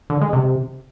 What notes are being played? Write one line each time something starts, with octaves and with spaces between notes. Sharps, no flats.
D3
G#3
C3